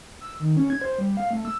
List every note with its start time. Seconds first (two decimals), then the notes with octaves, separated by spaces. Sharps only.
0.21 E6
0.40 D#3
0.57 C#4
0.70 G#6
0.81 C5
0.98 G3
1.17 F5
1.31 A3
1.45 E6